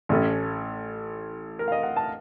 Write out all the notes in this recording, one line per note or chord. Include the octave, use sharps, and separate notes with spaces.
A1 A2 A3 C#4
A#4
F5
D#5
F#5
A5